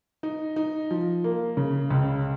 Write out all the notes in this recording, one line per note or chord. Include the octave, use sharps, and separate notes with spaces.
D#4
D#4
F3
A#3
C#3
C#2